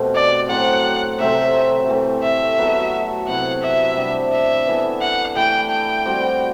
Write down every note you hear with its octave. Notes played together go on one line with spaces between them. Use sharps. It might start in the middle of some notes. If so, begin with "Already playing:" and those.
Already playing: B2 A3 C4 G4
D5
A2 F#3 C4 F#5
C3 F#3 A3 C4 E5
E3 A3 C4
E5
F#3 B3 F#4 A4
C3 F#3 B3 E4 F#5
E5
C3 G3 D4
E5
E3 B3 E4 A4
F#5
E3 A3 E4 G4 G5
G5
G3 C4 F#4